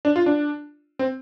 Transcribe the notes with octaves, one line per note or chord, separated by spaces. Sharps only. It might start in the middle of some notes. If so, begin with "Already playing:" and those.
D4
F4
D4
C4